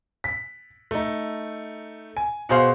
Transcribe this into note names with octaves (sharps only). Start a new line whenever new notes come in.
B6
A3 D#4
G#5
B2 F#4 G#4 C5 F5